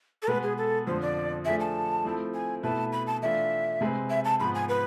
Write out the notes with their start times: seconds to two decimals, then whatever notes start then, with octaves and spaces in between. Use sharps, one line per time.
0.22 A4
0.28 B2 G#3 B3 B4
0.43 G#4
0.58 A4
0.86 F2 D3 F3 C5
1.02 D5
1.45 F3 A3 D4 G#4 E5
1.60 A5
2.05 F3 A3 C4 E4
2.34 G#5
2.63 B2 A3 E4 B4 A5
2.93 B5
3.07 A5
3.22 E3 A3 D4 F4 E5
3.81 C3 G#3 C4 G#4 B4
4.10 E5
4.25 A5
4.40 G#2 F3 B3 B5
4.55 G#5
4.69 B4